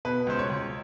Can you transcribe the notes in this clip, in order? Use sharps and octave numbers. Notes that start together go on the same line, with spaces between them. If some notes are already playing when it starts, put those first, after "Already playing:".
B2 B4
C#2 C5
C#5
C#2